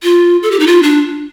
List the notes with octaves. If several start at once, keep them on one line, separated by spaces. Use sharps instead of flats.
F4
A4
G4
D#4
F4
D4